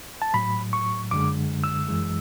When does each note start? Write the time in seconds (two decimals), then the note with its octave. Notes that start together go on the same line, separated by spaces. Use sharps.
0.22 A5
0.34 A2 F#3 B5
0.73 C#6
1.11 F#2 D3 G#3 D6
1.64 E6
1.89 F#2 E3 G#3